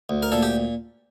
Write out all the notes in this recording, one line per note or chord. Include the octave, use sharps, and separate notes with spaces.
D2
A#4
A#2 A4
G4